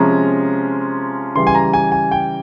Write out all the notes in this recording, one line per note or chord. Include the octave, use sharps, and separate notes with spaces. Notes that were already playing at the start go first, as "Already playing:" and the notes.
Already playing: C3 F3 G#3 C#4 A#5
C#3 E3 G3 C6
G#5
A#5
G#5
G#5
G5